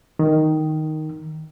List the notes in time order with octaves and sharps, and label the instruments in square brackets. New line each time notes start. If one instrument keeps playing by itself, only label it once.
[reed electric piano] D#3